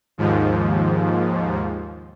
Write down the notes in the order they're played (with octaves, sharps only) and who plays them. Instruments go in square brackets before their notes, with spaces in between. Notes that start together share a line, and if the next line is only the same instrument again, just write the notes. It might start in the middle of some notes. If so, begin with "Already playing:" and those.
[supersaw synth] D#2 G#2 F3